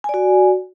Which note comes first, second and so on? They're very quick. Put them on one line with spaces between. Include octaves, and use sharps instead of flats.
G#5 D5 F#4